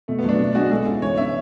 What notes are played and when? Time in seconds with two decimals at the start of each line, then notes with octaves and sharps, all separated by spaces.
0.08 B2 A3
0.19 B3
0.24 F#3 A3 D4
0.40 B2
0.55 G#3 D4 F#4
0.71 G#3 A4
0.86 C#4 E4
1.02 E3 C#5
1.17 B3 D4 E5